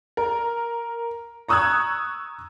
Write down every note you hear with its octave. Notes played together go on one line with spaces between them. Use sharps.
A#4
A#5 C#6 D#6 E6 F#6 G#6